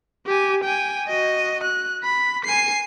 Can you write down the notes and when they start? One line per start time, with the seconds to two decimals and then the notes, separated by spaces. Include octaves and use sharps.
0.26 G4 G#5
0.64 G5 G#5
1.08 F#4 D#5
1.64 F#6
2.04 B5
2.45 G#5 C7